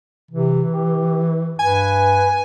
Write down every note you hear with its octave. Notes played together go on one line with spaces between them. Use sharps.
C3 E3
G4
G2 B4 G#5